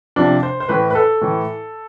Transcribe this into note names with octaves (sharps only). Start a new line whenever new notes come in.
C3 F3 D4
C5
C5
A2 E3 B4
B4
A4
A2 E3